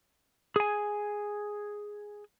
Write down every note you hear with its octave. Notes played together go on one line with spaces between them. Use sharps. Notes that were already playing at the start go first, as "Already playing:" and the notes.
G#4 G#5